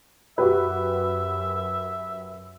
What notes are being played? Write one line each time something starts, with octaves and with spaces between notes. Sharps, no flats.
F#2 F#4 G4 B4 E5